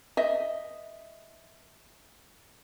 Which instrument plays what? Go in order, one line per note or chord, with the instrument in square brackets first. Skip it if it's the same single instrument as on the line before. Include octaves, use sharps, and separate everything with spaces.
[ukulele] D#5 E5